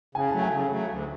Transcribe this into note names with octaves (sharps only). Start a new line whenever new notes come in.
C#3 G#5
F#3 A3 A5
G#5
C#3
F#3 A3
D2